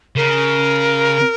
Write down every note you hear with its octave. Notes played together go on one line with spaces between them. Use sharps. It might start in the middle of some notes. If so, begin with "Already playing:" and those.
C#3 A#4